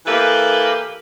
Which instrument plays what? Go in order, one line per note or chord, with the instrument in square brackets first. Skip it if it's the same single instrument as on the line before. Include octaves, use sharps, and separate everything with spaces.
[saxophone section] E3 A#3 G4 A4 B4